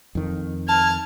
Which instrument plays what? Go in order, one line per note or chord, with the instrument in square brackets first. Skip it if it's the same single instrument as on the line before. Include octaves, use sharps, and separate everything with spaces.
[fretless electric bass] F2 D#3
[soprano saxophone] A5 [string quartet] F6 G#6